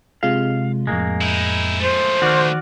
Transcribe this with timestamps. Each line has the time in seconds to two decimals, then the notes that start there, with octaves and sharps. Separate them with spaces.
0.23 C3 G#3 F4 F5
0.87 F2 A2 G#3 A#3
1.22 D#4 E4
1.81 F3 A3 C5
2.22 D#3 F#4 D5 C#6 F6